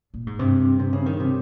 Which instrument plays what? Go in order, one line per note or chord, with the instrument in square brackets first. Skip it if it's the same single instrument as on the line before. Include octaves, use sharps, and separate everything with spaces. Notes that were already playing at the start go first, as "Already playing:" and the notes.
[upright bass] A#2
G#2
[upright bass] G2 [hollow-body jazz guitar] C3
[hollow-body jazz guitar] C3
C#3
D#3
C3